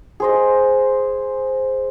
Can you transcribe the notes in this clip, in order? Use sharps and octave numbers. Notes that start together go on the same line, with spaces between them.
G#4 C5 D#5